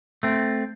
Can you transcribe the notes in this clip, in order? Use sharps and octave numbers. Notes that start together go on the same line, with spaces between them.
A3 C4